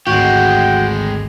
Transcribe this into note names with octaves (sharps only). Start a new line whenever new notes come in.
G#1 D2 G#3 F#4 G4 G5 G#6